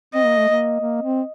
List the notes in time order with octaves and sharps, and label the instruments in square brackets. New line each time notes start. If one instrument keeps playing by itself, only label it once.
[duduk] C4 [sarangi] D#5
[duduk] A#3
A3
A#3
A#3
C4